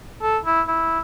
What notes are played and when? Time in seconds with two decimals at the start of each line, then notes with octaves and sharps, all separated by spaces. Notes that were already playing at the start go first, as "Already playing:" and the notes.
0.22 A4
0.45 E4
0.68 E4